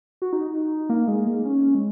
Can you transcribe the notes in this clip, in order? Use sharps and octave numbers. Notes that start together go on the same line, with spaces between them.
F#4
D#4
A#3
G#3
A#3
C#4
G#3